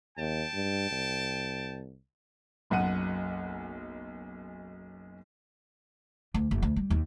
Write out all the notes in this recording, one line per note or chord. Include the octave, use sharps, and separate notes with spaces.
D#2 G5 A5
G2
C2
F#1 B1 F#2 F#5 D#7
D2
F#1
D2
G3
D#2